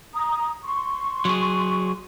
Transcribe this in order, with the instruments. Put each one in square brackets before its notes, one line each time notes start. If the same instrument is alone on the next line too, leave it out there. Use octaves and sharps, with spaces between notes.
[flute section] A#5 D#6
C6 C#6
[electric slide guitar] F#3 G#4